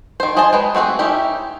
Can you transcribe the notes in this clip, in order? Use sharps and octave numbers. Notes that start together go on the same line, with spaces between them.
D#3 C5
G#4 C5 D#5 G#5 A5
G#3 B4 G5
A3 C4 F#4 G#4
C#4 D#4 E4 G4